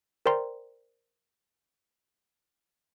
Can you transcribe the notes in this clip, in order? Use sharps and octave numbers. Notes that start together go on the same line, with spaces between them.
A#4 C5 D5 G5 A#5 C6